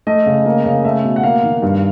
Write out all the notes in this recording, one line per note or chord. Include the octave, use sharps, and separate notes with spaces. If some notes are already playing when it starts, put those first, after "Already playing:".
A3 D#5
C#3
A#3
C#3
A3 E5
B2
F#5
A#3 F5
D#3
G2